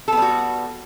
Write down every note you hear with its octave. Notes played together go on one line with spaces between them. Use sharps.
G3 B3 F#4 A4